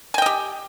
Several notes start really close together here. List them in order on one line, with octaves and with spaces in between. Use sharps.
G#5 G5 D#5 G4